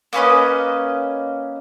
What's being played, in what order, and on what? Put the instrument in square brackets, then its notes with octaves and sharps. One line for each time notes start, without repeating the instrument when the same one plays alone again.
[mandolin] A#3 C#4 B4 D#5